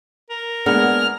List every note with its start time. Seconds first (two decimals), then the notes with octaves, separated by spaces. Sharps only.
0.30 A#4
0.66 G#3 A#3 B3 D4 F6